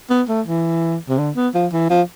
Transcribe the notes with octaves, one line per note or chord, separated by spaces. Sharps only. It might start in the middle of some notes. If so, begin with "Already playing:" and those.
B3
A3
E3
C3
D3
B3
F3
E3
F3